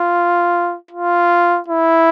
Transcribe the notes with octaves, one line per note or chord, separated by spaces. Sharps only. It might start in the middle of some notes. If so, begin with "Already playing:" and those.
Already playing: F4
F4
E4